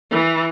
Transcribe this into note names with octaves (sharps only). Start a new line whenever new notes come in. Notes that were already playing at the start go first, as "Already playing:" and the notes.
E3